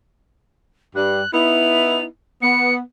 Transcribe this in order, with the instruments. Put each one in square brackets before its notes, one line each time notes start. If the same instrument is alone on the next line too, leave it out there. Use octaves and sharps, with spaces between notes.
[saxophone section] G2 G3 [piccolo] F#6
[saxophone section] B3 D#4 E4 [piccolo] F7
[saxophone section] B3 [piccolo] C#7